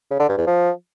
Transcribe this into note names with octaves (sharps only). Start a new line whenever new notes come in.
C#3
D3
G2
E2
F3